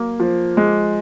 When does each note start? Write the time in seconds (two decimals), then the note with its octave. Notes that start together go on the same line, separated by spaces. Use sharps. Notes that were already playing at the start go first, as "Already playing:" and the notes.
Already playing: F#3 A#3
0.20 F3
0.57 G#3